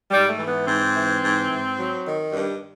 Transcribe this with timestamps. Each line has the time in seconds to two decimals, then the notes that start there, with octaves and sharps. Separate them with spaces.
0.11 G#2 G3
0.29 A3
0.39 E3
0.48 B3
0.66 G#2 C4
0.94 E3
1.22 G#2
1.49 G#2
1.77 F#3
2.04 D#3
2.32 G2